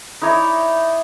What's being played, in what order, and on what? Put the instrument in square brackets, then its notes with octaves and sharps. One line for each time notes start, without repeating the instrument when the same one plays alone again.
[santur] D#4 E4 C#5 D5